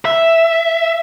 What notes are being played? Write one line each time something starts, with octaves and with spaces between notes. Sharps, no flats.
E5